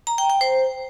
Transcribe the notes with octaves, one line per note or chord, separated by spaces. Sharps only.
A#5
G5
G5
C5